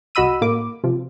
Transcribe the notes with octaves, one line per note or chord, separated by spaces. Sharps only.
C2 F#4 D#5 B5 E6 D#7
A2 A#3 D6
C3 F3